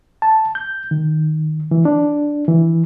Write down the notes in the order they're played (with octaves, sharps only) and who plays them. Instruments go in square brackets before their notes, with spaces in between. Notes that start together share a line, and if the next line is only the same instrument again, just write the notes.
[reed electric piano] A5
G6
D#3
E3
D4
E3